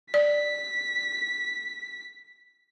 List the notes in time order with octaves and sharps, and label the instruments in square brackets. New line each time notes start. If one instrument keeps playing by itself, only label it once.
[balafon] D5 [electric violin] B6